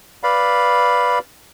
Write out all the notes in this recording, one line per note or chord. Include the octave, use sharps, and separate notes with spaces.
B4 D5 F5 B5